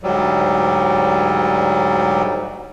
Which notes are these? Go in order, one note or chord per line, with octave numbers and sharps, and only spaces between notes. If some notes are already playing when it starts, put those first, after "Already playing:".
D2 G#2 F#3 G3